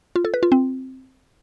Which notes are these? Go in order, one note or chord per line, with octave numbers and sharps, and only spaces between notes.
F4
A4
B4
F4
C4